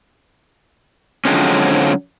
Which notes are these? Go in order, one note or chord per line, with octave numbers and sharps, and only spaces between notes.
D3 F3 F#3 G#3 C4 C#4